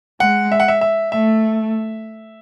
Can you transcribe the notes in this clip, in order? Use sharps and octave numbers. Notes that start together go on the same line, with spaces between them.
G#3 F#5
E5
F#5
E5
E5
A3 E5